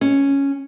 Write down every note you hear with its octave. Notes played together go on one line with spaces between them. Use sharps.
C#4